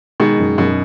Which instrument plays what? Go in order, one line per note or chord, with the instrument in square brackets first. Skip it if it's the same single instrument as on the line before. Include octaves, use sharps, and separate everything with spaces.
[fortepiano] B2 D#3 [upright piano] G#3
[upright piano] F#2
[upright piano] F#2 [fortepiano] B2